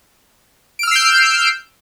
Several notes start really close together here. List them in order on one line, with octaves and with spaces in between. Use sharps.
D7 F6 E6 C7 G6